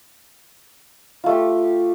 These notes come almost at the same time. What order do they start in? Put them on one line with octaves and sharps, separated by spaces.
F4 A3 G4